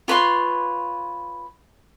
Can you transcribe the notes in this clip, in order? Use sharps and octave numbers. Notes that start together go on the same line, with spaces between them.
F4 B4 C#5 C6